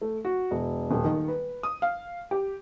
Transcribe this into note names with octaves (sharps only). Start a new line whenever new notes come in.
A3
F#4
E1
D#1
D#3
B4
D#6
F5
G4